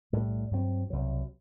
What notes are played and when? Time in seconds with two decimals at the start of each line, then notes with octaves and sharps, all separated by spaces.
0.12 B1 A2 G3
0.51 G2 F#3 A3 C4
0.90 C2 B2 F#3